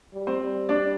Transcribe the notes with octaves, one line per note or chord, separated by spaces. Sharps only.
G3
C4 C5
G3
D4 D5